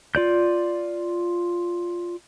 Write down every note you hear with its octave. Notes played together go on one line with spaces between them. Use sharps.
F4 D5 G6